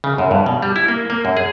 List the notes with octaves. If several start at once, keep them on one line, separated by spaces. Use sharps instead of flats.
C#3
F#2
G2
B2
G3
E4
A#3
A#3
F#2
G#4